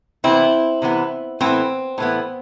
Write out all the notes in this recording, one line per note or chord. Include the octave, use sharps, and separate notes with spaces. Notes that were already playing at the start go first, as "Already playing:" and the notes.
C3 E3 B3 C4 E4
C3 E3 B3
A2 E3 B3 C4
A2 E3 B3